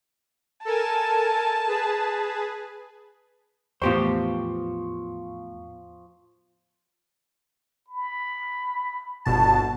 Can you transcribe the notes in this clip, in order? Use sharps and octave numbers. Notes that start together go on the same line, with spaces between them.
A4 A#4 G#5 A5
G#4 B4
E2 A2 F3 B3 G4 C5 C#6
B5
G1 B2 A5